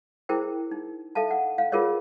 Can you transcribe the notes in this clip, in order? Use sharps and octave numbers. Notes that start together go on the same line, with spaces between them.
E4 G#4 A#4 C5 G5
D#4
A4 E5 F5 A5
F#5
F5
F4 G#4 A#4 B4 C#5 D#5